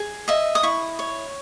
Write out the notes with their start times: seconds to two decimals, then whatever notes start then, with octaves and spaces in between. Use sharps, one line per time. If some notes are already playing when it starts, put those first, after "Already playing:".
Already playing: G#4
0.28 D#5 E5
0.55 D#6
0.63 E4 C#6
0.99 C#5